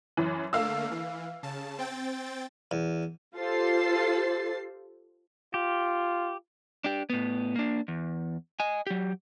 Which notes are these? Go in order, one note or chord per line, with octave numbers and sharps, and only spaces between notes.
F#2 E3
D3 A3 A#3 F5 E6
E3
C#3 A5
C4 G5 A6
E2
F4 G4 A4 C5 A6 C7
F4 G4
D4 G4
A2 B3
A#3 D4
E2
D#5 G#5
F#3 G4